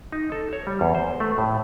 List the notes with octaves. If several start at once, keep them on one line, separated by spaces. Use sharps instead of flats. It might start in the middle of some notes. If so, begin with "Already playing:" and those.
D#4
A4
C#5
G3
E2
C5
A3
A2